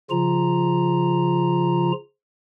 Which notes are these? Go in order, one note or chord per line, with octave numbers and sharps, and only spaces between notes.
C#3 F3 F4 A#5